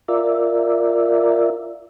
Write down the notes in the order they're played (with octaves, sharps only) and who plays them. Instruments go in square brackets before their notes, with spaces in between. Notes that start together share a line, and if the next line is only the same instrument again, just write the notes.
[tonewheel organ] F4 A#4 D5 E5